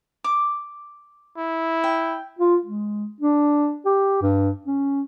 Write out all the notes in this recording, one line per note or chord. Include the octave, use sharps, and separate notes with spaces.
D6
E4
G5
F4
G#3
D4
G4
G2
C#4